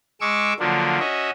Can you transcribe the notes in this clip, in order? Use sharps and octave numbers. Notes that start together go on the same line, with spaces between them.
G#3 C#6 D6 E6
D3 F3 F#3 A#3 D4
C#4 F#4 D#5 E5